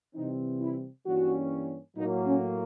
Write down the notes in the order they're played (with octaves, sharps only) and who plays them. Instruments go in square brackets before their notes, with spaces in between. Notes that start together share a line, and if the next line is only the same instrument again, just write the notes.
[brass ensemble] C3 E3 G3 C4 [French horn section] D#4
[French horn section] E4
[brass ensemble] G2 E3 G3 A#3 C#4 [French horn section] F#4
[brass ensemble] A2 F#3 A#3 [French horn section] D#4
[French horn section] C#4